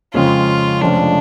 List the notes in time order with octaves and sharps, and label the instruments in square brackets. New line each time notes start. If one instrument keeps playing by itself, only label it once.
[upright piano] F2 C#3 G#3 C#4 [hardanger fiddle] F4
[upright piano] F1 F2 F3 G#3 C#4 [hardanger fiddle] D4